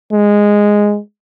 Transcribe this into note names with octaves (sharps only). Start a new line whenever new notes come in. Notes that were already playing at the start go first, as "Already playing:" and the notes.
G#3